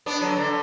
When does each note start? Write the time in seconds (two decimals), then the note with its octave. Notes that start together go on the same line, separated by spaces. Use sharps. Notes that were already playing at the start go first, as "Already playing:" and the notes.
0.06 B3 D4
0.21 D3 F#3
0.37 D3